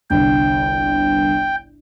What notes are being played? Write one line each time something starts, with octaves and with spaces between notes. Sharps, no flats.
G1 C2 G2 G5